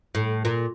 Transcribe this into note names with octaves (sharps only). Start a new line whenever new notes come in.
A2
A#2